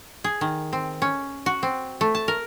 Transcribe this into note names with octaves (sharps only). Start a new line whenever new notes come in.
G#4
D#3
C4
C#4
F#4
C4
A3
A5
A#4